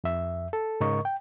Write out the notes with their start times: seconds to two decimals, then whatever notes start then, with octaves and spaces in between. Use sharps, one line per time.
0.04 F2 E5
0.53 A4
0.81 G#2 C#3 A#4 D#5 C#6
1.05 G5